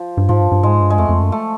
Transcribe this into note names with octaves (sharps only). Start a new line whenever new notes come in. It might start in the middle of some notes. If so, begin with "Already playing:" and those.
Already playing: F3
G2
G#2 F3
G2
G2
G#2 G#3
G2
G#3
F2 A3
F2
F#2
A3